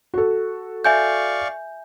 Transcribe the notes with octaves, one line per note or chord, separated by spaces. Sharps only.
F#4 A4
D5 E5 F5 G#5 C#6 G6